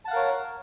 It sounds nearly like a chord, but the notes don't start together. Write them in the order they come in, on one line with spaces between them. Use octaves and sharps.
A5 F#5 F5 A#4 C#5